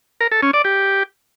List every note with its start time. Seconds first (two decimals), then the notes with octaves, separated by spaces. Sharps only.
0.21 A#4
0.32 A4
0.43 C#4
0.54 D5
0.64 G4